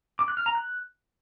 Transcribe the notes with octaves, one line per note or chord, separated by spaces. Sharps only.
D6
F#6
F6
A#5
F#6